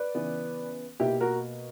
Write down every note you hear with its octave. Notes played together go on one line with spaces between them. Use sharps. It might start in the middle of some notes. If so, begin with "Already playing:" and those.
Already playing: B4 D5
C#3 E3 B3
B2 A#3 E4 G4
F#4 A#4